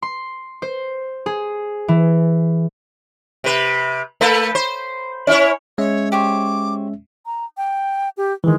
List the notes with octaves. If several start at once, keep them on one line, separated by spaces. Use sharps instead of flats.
C6
C5
G#4
E3
C3 B4
A3 A4 B4
C5
C#4 E4 C#5
G#3 C#4 C#5 E5
G4 C5 C#5 D6
A#5
G5
G4
D#3 E3 G#3